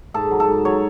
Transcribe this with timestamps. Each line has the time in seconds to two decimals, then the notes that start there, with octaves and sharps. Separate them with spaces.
0.14 G#2 A4
0.31 F#3
0.40 A4
0.48 G#2
0.65 F#3 C#5